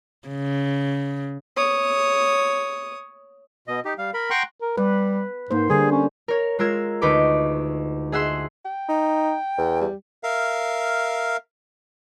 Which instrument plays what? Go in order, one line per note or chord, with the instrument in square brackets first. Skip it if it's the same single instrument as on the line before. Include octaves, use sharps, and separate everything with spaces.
[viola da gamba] C#3
[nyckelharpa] C#5 D#6
[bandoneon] B2 D#5
D#4 G4
G3 F5
A#4 B5
F#5 G5 A#5 C6 C#6 F#6
[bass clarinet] A#4
[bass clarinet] G3 [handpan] B4
[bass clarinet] G#2 [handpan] A#3 C5
[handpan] D3 G3 [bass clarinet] G#4
[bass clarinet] C#4
[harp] A#4 C#5
G#3 F4 A#4 E6 G#6 C7
D2 D#4 B4 C#6 D6
G#4 E5 F#5 C6 E6
[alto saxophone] G5
[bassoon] D#4
E2
[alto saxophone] G3
[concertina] A#4 E5 F5